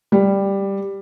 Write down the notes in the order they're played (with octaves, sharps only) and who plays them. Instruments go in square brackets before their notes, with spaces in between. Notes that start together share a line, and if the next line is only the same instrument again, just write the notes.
[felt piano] G3